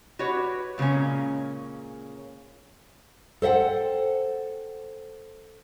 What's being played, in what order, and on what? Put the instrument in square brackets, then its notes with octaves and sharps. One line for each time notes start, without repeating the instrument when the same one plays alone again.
[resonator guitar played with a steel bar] F#4 G4 B4 C#5
A#2 C#3 G#3 A#3 C#4
[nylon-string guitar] A4 C5 E5 F#5 G5